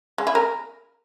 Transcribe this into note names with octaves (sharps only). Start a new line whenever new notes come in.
G#3
E4
A#4